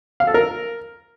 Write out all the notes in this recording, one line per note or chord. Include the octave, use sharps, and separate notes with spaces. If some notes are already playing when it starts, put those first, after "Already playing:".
F5
A4
A#4